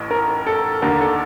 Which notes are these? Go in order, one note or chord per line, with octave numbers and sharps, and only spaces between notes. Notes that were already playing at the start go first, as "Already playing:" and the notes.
Already playing: A1 A2
A#4
A4
D#2 D3 A#4
A4